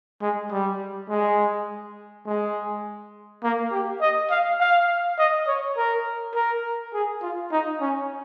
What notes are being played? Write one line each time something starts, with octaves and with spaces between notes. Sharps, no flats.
G#3
G3
G#3
G#3
A#3
G4
D#5
F5
F5
D#5
C#5
A#4
A#4
G#4
F4
D#4
C#4